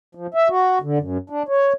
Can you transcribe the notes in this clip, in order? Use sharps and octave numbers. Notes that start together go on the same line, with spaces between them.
F3
E5
F#4
D3
F#2
D4
C#5